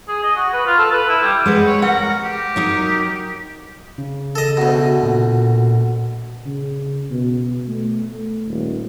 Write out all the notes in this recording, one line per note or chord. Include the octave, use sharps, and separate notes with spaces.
G#4
D#5
F#4
B4
F4
A4
B4
E4
G3
G#3 B4 D#5 F#5
C#5
A#4 F#5
G4
F#3 D#4 A#4
C#3
A4 D#5
D2 B2
A#2
C#3
B2
A3
D#1